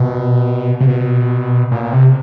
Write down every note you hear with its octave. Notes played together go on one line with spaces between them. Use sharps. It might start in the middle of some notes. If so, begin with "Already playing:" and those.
Already playing: B2
C3
B2
A#2
C3